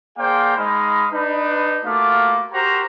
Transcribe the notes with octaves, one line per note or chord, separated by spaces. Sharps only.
A#3 G#4 C5 D5 F5 G5
G#3 D#4 D#5 F5 B5
D4 D#4 B4
A3 A#3 F4 F#4 F5 D6
F#4 G4 A#4 C5 A#5